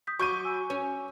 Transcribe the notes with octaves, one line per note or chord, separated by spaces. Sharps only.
D#6 G6 B6
F#3 B5 C#6 D6 G6 D#7
G#5 E6
C#4